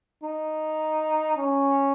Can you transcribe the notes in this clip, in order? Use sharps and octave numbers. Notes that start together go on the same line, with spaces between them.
D#4
C#4